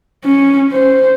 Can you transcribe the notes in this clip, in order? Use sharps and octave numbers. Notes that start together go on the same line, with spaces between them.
C#4
C5